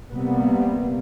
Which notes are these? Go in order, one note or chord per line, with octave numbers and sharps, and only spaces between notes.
C3 G3 A#3 B3